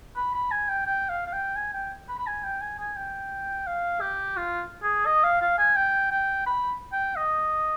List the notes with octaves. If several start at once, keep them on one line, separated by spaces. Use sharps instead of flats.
B5
B5
G#5
G5
G5
F5
F5
G5
G#5
G5
B5
B5
G#5
G5
G#5
G#5
G5
F5
G4
F4
G#4
D#5
F5
F5
G#5
G5
G5
B5
G5
D#5